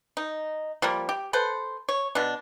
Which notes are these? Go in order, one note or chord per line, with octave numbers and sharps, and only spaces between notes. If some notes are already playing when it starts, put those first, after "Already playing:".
D#4
F3 G3 A#3
G4
A4 B4 C5
C#5
B2 D4